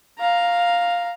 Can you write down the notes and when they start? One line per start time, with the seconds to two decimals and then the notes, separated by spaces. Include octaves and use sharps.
0.19 F5 A#5